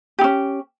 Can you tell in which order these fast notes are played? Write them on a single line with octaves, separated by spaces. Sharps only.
G4 D#4 C#4